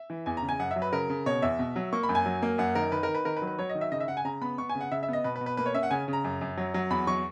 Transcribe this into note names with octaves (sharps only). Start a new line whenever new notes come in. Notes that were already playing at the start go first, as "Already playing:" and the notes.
Already playing: E5
E3
E2 G#5
A#5
C#3
G#5
F#2 F#5
E5
F#3
B4
C#3 A#4
C#3
B2 C#5
E2 E5
B2
F#3
A#3 C#6
B5
F#2
G#5
F#3
A#3
F#2 F#5
D#3 A#4
D#3 B4
A#4
D#3
B4
D#3 A#4
B4
F#3
B4
F#3 C#5
D#5
D#3
E5
C#3 D#5
E5
C#3 F#5
G#5
C#3 A#5
B3 B5
B3 C#6
G#5
C#3
F#5
C#3 E5
E5
B3 D#5
B2 B4
B4
B2
B4
A#3 B4
C#5
C#4 E5
F#5
C#3 G#5
C#3
A#5
F#2
F#2
F#3
F#3
E2 B5
F#3 C#6